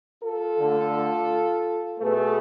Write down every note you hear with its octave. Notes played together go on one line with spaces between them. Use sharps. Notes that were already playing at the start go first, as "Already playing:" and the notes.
F4 A4
D3 A3
B2 A3 G#4 B4